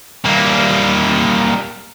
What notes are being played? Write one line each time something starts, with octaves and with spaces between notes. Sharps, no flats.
G3 A#3